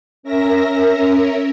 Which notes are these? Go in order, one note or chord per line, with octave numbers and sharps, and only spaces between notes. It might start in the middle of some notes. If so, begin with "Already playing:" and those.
C#4 A#4 E5 A#6